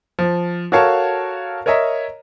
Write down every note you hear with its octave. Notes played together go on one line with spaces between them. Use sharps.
F3
F#4 A4 A#4 C#5 F5 A5
A#4 C#5 D#5 E5 A#5